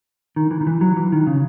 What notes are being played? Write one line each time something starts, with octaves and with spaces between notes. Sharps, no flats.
D#3
E3
D#3
E3
F#3
E3
D#3
C#3